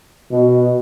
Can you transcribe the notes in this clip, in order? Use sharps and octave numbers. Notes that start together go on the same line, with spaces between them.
B2